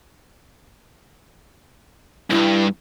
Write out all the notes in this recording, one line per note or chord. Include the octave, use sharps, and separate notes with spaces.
C2 G2 E4